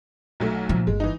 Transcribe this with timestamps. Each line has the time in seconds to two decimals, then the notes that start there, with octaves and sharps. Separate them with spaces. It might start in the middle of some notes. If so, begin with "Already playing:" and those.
0.40 B1 F#3 A3
0.69 A#2 F3
0.87 G1 G#3
1.00 E3 D#4